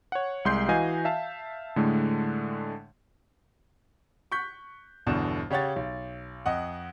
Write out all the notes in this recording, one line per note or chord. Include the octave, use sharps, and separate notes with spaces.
C#5 F#5
C2 G#3 C6 G6 C7
E3 F#4 D#5 F5 G#5
E5 F5 A5
A2 D3 G#3 A3
C#6 F#6 G6 B6
G1 E2 B2 D3 E7
C#3 G4 C#5 F#5 A6
B1
F2 D#5 F#5